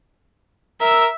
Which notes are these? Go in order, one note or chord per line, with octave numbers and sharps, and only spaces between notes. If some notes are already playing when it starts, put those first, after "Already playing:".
A#4 E5 E6